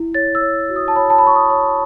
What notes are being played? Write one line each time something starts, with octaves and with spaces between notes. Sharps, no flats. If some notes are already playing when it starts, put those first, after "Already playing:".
Already playing: E4
C#5 A6
E6
C#5
F#4
D#6
A5
C#5 B5
A5
B5
C#5 C#6
D#6
C#5